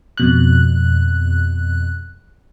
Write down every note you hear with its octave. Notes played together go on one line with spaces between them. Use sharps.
F2 B2 F#6